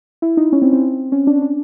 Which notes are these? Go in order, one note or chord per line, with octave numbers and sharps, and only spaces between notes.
E4
D#4
C#4
C4
C4
C#4
D4
D4